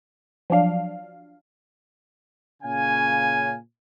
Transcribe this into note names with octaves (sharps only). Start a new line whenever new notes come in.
F3 F#3 D4 F5
A#2 C#3 C#4 F5 G#5